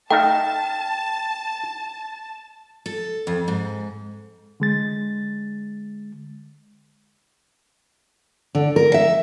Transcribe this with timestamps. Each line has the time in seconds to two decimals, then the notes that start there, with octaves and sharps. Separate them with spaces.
0.11 A3 D#4 F5 G5 A5
2.86 A4
3.27 F2
3.48 G#2
4.60 D3 G#3 A6
8.55 D3
8.76 A#4
8.94 E5